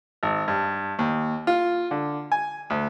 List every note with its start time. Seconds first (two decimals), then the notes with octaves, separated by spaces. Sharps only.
0.23 G#1
0.48 G2
0.99 D#2
1.47 F4
1.91 D3
2.32 G#5
2.70 D2